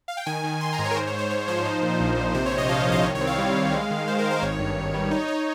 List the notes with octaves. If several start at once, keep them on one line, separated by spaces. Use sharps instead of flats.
F5
G5
D#3 G#5
D#3
D#3 C6
A#5
G#2
C#5
A#4
G#2 C5
C#5
G#2
C5
G#2 C#5
F3 C5
D#4
A#2
A#1
A#1
C3 C5
C#5
C3
D#5
F3 F5
C2
D#5
D#3 C#5
C#5
C4
F5
G3
G3
G#3
D#3
D#3 C5
A#4
D#3
C5
G#1 C#5
G2
G#1
G3
D#4
D#4